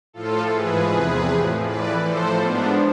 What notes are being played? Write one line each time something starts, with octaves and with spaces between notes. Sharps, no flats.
A2 F3 F4 A4
G#2 E3 G#4 B4
E2 C3 F3
A2 F3
A2 E3 B4 D5
A2 F3 A4 C5
G#2 F3 B3 D4